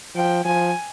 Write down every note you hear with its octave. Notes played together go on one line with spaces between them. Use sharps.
F3 G5
F3 G#5